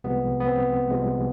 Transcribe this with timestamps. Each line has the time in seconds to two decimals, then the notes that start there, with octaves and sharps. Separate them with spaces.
0.04 C2 C3 F3 G#3 B3
0.40 B3
0.48 C4
0.91 C2 C3 F3 G#3